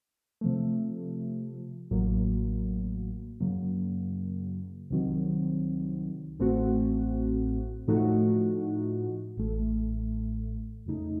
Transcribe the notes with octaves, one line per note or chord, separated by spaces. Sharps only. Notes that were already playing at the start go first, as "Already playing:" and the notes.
C3 F3 A3
A1 A2 F#3 A#3
F#2 C#3 F#3 A#3
C2 C3 D#3 F#3 C4
A1 A2 A3 C4 F#4
A2 F3 A3 D#4 F#4
A1 A2 A3
F2 C#3 A3 D#4